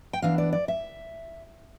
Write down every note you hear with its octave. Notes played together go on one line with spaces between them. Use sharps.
G5
E3 B3 D4 F5
D5
D5
E5